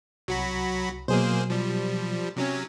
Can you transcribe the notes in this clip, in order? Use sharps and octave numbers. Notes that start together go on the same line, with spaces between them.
C2 F#3 F#4 B5
B2 F#3 A#3 G#4 C5
F3 G3
C3 F#3 C#4